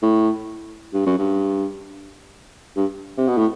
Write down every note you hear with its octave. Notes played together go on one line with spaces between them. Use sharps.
A2
G2
F#2
G2
G2
C3
B2
A2